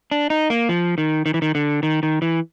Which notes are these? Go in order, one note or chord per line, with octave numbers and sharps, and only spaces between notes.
D4
D#4
A#3
F3
D#3
D#3
E3
D#3
D3
D#3
D#3
E3